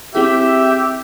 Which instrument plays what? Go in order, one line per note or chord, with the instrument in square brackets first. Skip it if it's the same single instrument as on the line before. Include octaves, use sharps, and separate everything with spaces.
[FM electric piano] C4 E4 G#4 [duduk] G4 [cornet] E5